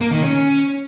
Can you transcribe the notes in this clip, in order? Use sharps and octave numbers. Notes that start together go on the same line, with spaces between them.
A#3
D#3
C#4